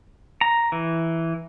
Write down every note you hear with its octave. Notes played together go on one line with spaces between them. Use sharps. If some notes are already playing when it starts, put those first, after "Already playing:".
A#5
E3